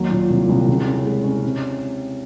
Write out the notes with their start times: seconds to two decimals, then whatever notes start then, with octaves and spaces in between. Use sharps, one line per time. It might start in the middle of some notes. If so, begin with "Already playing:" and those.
Already playing: D#2 F#3
0.11 A#2
0.30 C2
0.49 C2
0.68 C#3
0.87 C#4
1.06 G#3
1.24 C#4
1.44 C3